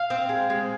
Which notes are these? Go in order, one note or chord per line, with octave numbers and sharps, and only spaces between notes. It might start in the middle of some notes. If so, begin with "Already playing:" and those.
Already playing: F5
C4
G#3
G#3